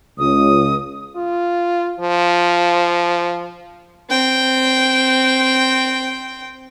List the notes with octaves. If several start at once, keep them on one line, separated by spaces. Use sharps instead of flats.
C#2 D#6
F4
F3
C4 G5